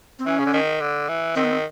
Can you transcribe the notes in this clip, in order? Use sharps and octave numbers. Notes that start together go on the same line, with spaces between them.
C4
E3 C#4
C#3
D3
D#3
D3
E3
D#3 C4
B3
C4